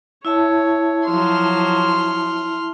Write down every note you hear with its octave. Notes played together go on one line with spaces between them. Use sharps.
E4 C#5 E5 A5
F3 F#3 C6 F6